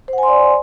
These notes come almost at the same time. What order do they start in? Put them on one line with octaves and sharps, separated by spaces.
C5 F#5 G#5 C6 D5